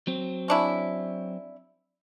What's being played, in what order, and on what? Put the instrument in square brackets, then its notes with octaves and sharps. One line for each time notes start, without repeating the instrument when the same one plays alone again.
[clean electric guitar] F#3 C4
[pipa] C#4 D4 E4